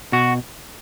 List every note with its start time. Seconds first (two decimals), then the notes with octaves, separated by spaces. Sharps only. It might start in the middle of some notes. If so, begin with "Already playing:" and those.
0.12 B2 F#4